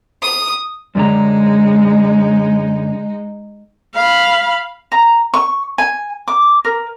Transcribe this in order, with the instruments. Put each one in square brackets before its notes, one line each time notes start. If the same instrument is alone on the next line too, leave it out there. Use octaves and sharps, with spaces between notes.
[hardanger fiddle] D#6
[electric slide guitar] F#2 D3 A#5 [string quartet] G#3 D#4
[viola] F5 B5
[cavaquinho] A#5
C#6
G#5
D6
A#4